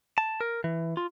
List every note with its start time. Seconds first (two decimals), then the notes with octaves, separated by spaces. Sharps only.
0.18 A5
0.41 A#4
0.64 E3
0.97 F4